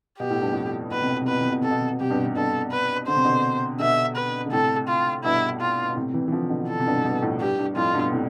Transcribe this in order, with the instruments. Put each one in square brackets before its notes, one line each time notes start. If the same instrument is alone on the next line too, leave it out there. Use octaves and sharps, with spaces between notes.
[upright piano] B2 [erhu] G4
[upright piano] A2
G2
F2 A2
[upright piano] B2 [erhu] B4
[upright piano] C3
B2
C3
[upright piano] B2 [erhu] B4
[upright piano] C3
B2
[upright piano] C3 [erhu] A4
[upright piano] B2
C3
B2
[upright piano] C3 [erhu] G4
[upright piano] G2 B2
C3
[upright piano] G2 B2 [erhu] A4
[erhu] B4
[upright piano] D3 [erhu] C5
[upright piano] C3
B2 D3
[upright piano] B2 D3 [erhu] E5
[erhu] B4
[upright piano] D3
[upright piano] A2 C3 [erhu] A4
[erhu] F4
[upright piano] G2 B2 [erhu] E4
[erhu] F4
[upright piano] B2
A2 C3
C3 E3
E3
D3 F3
B2 D3
[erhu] A4
[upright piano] C3
G2 B2
G2 B2
F2 A2
[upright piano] G2 [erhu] G4
[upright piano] G2
[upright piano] F2 A2 [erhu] F4
[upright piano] G2 B2
A2 C3